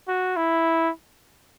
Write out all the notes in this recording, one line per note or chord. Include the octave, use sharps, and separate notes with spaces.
F#4
E4